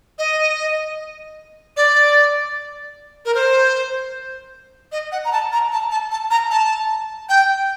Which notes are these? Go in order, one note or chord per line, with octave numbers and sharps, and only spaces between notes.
D#5
D5
A#4
C5
D#5
F#5
A#5
A5
A#5
A5
A5
A5
A#5
A5
G5